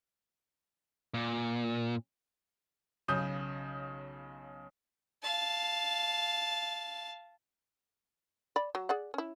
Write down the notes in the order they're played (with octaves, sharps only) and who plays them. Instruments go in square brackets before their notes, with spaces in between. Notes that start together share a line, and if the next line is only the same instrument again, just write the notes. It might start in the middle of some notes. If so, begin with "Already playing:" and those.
[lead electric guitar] A#2
[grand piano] B1 C#3 D#6 G6
[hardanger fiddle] F5 A5
[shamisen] D5 B5
F#3
G#4 D5 F#5
C#4 E4